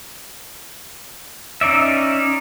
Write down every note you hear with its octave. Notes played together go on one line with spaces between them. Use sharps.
C#4 D#4 D5 E5